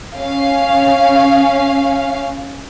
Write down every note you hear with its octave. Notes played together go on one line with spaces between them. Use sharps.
C#4 F5